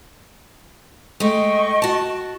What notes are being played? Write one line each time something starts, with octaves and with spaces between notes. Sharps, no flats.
G#3 A3 D#5 G5 C#6
F#4 A5